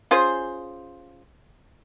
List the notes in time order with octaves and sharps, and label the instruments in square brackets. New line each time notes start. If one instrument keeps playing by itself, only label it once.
[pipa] C#4 F4 G#4 C5